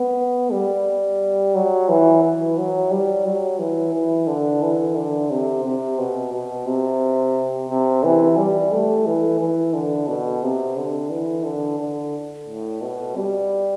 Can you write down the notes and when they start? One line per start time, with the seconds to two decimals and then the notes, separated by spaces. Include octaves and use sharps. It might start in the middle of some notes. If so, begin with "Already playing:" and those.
Already playing: B3
0.52 G3
1.55 F#3
1.89 E3
2.23 E3
2.58 F#3
2.91 G3
3.25 F#3
3.59 E3
3.94 E3
4.27 D3
4.62 E3
4.97 D3
5.30 C3
5.64 C3
5.99 B2
6.33 B2
6.67 C3
7.70 C3
8.04 E3
8.37 G3
8.72 A3
9.06 E3
9.40 E3
9.74 D3
10.08 B2
10.43 C3
10.76 D3
11.10 E3
11.44 D3
11.79 D3
12.47 A2
12.82 B2
13.16 G3